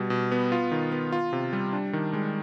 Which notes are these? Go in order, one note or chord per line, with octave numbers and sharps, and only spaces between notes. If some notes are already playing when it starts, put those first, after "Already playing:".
Already playing: B2 G3
B2
B3
F4
D#3
B3
F4
C3
G3
D4
D#3
G#3